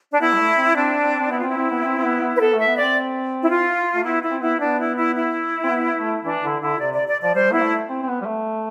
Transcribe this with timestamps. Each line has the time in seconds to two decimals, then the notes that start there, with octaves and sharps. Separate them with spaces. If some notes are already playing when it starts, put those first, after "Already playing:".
0.11 D4
0.20 B3 E4
0.33 G3
0.38 A3
0.57 C4
0.75 C4 D4
1.02 C4
1.20 C4
1.30 B3 E4
1.39 F4
1.43 C4 E4
1.57 C4
1.71 B3
1.85 C4
1.98 C4
2.04 B3
2.21 B3
2.36 B4
2.40 B3 A4
2.53 A3
2.58 E5
2.67 B3
2.76 C4 D5
3.42 E4
3.50 F4
3.94 A3
4.04 B3 E4
4.23 E4
4.31 C4
4.41 B3 E4
4.59 B3 D4
4.79 E4
4.97 E4
5.15 E4
5.64 C4
5.70 B3
5.97 A3
6.24 E3 D4
6.43 D3 E4
6.61 D3 E4
6.79 C3 D5
6.93 D5
7.07 D5
7.21 F3 D5
7.34 G3 C5
7.53 B3 E4
7.62 A3
7.89 C4
8.03 C4
8.08 B3
8.22 G3
8.26 A3